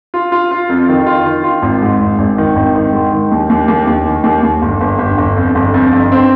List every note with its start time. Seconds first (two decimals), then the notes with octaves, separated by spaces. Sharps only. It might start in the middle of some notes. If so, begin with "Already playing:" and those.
0.14 F4
0.32 F4
0.51 F4
0.70 F2
0.89 D#3
1.06 F4
1.26 D#3
1.44 F4
1.63 G#1
1.82 G#2
2.01 G#1
2.19 G#1
2.38 D#3
2.56 G#1
2.75 D#3
2.93 G#2
3.13 D#3
3.32 D#2
3.50 D#2
3.68 D#2
3.87 D#2
4.05 D#3
4.24 D#2
4.43 D#2
4.62 G1
4.81 G1
4.99 G1
5.18 G1
5.37 F2
5.55 G1
5.74 F2
5.93 G1
6.12 C4